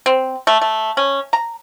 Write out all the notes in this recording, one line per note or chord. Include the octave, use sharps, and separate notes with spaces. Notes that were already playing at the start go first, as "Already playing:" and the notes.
C4
A3
A3
C#4
A#5